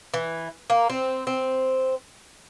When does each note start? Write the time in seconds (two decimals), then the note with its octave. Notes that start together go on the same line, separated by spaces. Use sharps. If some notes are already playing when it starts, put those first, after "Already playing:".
0.14 E3
0.70 A#3
0.90 C4
1.27 C4